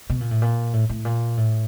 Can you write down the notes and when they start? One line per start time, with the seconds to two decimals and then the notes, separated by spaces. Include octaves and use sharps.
0.10 B2
0.21 A#2
0.31 A2
0.42 A#2
0.73 A2
0.90 A2
1.05 A#2
1.37 A2